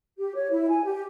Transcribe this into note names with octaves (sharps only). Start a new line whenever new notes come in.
G4
C#5
E4
G#5
G4